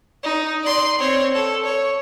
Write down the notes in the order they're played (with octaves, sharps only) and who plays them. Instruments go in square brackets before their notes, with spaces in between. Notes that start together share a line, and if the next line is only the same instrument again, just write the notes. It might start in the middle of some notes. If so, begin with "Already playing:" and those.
[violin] D#4
D5 C6
C4 C#5
A4
C#5